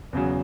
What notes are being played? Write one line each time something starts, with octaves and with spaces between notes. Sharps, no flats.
E2 C#3 F#3